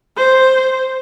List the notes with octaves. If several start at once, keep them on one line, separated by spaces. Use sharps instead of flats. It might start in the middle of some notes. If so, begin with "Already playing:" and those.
C5